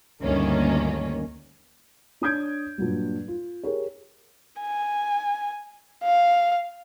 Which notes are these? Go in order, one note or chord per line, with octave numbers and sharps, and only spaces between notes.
D2 G2 D#3 A#3 C#4
D4 C#5 D#6 G6 G#6 D7
G2 A#2 F#3 G3
F4
G4 G#4 A#4 C#5
G#5
F5